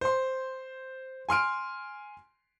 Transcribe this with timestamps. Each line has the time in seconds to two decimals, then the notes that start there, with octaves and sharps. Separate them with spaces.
0.01 C5 C6
1.29 G#5 C6 F6 D7